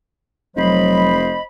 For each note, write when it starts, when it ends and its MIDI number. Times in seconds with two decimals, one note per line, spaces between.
0.56 1.36 29
0.56 1.14 54
0.56 1.43 72
0.56 1.42 75
0.56 1.43 83